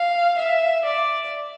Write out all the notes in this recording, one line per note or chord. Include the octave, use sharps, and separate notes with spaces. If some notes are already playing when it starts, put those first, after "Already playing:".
Already playing: F5
E5
D5